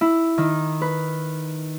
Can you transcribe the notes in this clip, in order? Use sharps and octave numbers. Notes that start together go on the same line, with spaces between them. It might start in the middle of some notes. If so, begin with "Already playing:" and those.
E4
D#3
B4